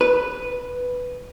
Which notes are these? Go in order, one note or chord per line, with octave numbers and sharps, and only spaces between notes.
B4